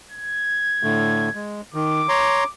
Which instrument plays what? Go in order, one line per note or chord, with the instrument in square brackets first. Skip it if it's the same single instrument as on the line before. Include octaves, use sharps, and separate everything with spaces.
[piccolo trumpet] G#6
[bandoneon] A2 D3 A3
G#3
[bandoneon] D#3 [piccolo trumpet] D6
[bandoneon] C#5 A#5 C6